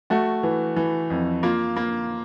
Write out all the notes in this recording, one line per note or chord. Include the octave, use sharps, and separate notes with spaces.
A3 F#4
E3
E3
F2
A#3 F4
A#3